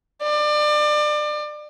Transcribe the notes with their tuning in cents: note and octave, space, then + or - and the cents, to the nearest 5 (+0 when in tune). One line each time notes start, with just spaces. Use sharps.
D5 +30